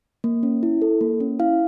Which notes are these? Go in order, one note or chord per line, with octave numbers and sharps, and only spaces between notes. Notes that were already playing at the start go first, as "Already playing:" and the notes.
A#3
C#4
E4
A4
A#3
C#4
E4 F5